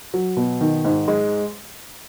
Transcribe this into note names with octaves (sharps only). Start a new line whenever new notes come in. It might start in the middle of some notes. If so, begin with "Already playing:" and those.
F#3
B2
D#3
G#2
G#3